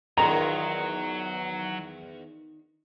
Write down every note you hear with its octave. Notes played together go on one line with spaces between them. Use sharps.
E2 D#3 F#3 F4 G#4 A#5